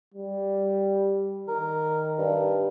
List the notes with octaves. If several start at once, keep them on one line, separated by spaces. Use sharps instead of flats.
G3
D#3 A#4
G2